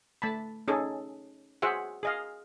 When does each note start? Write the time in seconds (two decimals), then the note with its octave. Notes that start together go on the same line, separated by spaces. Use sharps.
0.22 A3 A5 B5
0.68 C#4 D#4 G#4 A4
1.62 F#4 G#4 C5 E5 F#5
2.03 G#4 D#5 F5